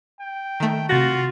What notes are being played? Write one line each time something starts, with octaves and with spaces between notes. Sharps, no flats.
G5
D#3 A3
C3 F4 F#4 A6 A#6